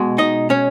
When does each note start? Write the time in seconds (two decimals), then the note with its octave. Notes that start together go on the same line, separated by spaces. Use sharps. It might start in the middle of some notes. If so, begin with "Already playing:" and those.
Already playing: B2 G#3
0.18 D#4 D#5
0.50 C#4 C#5